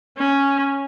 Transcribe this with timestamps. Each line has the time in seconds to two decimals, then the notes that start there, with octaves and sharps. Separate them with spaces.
0.17 C#4